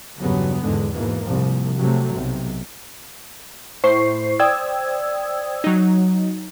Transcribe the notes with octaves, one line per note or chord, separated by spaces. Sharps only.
E2 G2 C#3 F#3 B3
E2 G#2 D3 G#3
G#2 B2 E3 A#3
C2 A#2 F3
C3 F#3 A3
B1 C3
A2 E4 C5 C#6 C7
C5 D5 G5 D#6 E6 G#6
F#3 D#4